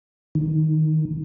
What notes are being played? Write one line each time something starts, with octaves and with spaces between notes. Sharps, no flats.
D#3